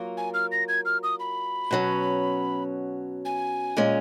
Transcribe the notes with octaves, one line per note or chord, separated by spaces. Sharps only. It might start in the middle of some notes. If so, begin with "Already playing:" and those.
Already playing: F#3 A#3 F4 A#4
G#5
F6
A#6
G#6
F6
D#6
B5
B2 F#3 C#4
G#5
A#2 G#3 C#4